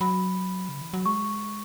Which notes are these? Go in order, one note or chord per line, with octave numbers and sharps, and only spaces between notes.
F#3 B5
C#3
E3
F#3
G#3 C#6